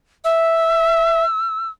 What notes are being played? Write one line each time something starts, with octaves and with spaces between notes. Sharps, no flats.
E5 E6